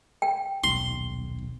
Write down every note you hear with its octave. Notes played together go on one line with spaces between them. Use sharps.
G5
D#1 B1 C6